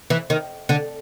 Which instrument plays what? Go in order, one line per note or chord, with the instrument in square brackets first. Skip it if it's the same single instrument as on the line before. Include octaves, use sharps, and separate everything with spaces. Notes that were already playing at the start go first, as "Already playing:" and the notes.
[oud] E3
D#3
D3